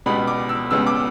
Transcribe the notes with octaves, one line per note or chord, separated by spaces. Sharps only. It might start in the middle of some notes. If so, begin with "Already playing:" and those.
C#2 B2 G3 B3 B5
D6
E6
C#2 C#3 G3 B3 E6
D6